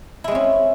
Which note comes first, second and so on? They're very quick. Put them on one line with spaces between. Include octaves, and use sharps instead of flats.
E4 G#3 C4 C#4